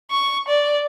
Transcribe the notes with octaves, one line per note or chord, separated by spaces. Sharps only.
C#6
D5